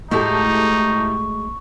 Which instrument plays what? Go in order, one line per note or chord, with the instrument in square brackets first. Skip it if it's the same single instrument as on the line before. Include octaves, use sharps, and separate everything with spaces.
[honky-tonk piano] A2 G4 A4 [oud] G#3 A3 F#4 [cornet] D#4 [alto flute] C#6